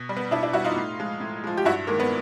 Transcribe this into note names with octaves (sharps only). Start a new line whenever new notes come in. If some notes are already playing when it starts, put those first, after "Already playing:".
Already playing: B2
G3
B3
B2 D4 E4
D4 E4
G3 E4 F#4
D#4 F4
A2
F3 G#3
A2
F3 G#3
G4
G2 E4 F#4
D#3 G#3 A#3
B3